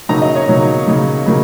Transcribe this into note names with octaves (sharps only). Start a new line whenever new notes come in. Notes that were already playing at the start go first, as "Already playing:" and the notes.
C#3 F#3 A#3 D#4 A#5
D#5
C#5
C#3 F#3 A#3 D#4
C#3 F#3 A#3 D#4
C#3 F#3 A#3